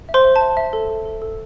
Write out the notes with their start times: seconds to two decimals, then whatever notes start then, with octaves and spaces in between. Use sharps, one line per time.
0.09 E5
0.14 C5 C6
0.24 E5
0.36 A5
0.41 E5
0.57 E5
0.73 A4
0.90 A4
1.05 A4
1.22 A4